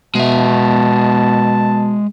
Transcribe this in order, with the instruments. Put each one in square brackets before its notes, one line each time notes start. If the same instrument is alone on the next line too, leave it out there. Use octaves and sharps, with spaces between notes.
[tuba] B2 [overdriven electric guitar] G#3 E5 [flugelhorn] A5